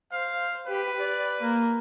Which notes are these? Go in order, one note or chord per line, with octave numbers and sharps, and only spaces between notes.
C5 F5
G4 B4
D5
A#3